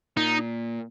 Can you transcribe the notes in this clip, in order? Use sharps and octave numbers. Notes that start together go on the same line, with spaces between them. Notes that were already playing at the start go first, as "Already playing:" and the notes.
A#2 D#4